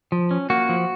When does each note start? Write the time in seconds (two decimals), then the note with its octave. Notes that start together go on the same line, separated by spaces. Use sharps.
0.12 F3
0.31 C#4
0.50 A#3 F#4
0.69 F3